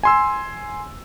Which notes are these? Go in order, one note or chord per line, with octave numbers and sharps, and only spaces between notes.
G#5 C6 E6